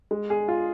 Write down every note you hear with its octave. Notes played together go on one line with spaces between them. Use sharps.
G#3
G#4
F4